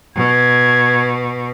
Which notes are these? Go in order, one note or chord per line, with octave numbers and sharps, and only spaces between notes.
B2 G#6